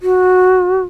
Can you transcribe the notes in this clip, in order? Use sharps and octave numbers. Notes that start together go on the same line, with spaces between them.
F#4